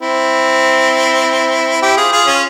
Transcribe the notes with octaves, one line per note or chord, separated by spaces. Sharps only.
C4 E4
E4 G4
F4 G#4
F4 G#4
C#4 F4